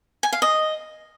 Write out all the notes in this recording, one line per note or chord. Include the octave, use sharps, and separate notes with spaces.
G#5
F5
D#5